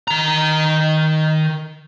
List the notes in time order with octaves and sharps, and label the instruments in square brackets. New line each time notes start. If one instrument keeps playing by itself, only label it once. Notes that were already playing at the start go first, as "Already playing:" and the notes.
[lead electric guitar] D#3 A#5